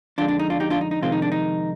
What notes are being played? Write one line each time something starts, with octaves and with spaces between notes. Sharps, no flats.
F2 D3 G#3 D4 F4
D4
D#4
D4 F4
D#4 G4
D4 F4
D#4
D#4
F2 C3 D#3 G#3 C4 F4
D#4
D4
D#4